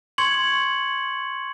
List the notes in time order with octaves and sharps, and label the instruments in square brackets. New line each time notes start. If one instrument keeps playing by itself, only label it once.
[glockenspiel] C6 C#6 G#6 C#7 F#7